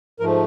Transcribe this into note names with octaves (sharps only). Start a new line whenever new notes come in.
G#2 F3 A3 A#4